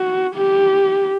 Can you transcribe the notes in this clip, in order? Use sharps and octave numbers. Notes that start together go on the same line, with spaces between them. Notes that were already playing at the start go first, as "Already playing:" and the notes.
Already playing: F#4
G4